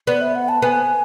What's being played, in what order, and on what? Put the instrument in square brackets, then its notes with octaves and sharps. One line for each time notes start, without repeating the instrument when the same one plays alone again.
[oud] B3 [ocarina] D5
[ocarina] E5
F#5
A5
[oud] B3 [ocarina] G#5